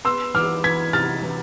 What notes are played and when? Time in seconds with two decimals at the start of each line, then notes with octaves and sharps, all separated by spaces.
0.05 B3 C6 E6
0.34 E3 D6 F6
0.64 E3 G#6 B6
0.93 C3 F6 A6
1.23 E3